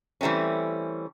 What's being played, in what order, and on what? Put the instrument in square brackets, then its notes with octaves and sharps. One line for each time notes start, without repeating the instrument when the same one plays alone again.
[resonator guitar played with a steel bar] E3 G3 A3 C4 C#4